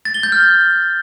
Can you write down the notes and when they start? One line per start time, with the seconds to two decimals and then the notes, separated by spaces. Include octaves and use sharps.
0.05 A6
0.14 G7
0.23 G6
0.32 F6